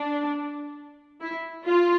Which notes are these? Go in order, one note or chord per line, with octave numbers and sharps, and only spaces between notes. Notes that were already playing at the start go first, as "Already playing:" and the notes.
Already playing: D4
E4
F4